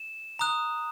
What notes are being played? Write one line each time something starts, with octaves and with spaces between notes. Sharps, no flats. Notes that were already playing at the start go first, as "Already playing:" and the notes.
Already playing: E7
A#5 D#6 F#6